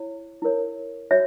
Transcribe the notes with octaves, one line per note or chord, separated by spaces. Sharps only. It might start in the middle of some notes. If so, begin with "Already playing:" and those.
Already playing: E4 C#5
E4 A#4 C#5
F#4 C#5 E5